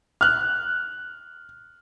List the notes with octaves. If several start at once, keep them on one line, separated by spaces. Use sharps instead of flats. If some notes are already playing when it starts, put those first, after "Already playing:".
F6 F#6